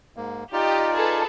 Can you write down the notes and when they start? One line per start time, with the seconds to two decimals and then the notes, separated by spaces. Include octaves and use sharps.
0.16 G#2 A#3
0.53 D#4 F4 G4 D5 D#5
0.95 G#4 A4 B4